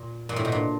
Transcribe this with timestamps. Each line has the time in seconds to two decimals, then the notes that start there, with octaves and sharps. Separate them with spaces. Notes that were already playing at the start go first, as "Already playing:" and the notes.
Already playing: A#2
0.29 A#2
0.36 A2 C#3 F#3 A#3 D4
0.45 B2
0.52 A#2